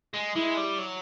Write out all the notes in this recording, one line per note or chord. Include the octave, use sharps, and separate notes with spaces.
G#3
G#3 E4
G3
F#3